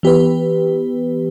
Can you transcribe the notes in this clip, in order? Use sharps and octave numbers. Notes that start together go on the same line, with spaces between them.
E3 B3 G4 B4